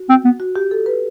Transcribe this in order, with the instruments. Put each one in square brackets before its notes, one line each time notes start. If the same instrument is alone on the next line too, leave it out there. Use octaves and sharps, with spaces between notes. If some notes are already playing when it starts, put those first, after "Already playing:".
Already playing: [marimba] F#4
[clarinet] C4
B3
[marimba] F#4
G4
A4
B4